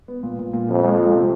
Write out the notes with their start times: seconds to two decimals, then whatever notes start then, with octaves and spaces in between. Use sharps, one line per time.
0.08 B3
0.23 A#2
0.39 A#2
0.53 A#2
0.69 F2 F3
0.84 G#3
0.98 F3
1.15 C3